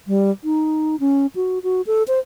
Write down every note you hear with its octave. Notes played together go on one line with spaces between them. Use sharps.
G3
D#4
C#4
F#4
F#4
A4
C5